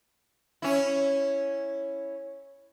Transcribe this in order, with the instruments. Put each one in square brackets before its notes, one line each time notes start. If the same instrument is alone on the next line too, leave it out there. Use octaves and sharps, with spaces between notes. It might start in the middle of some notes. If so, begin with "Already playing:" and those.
[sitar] C#4 E4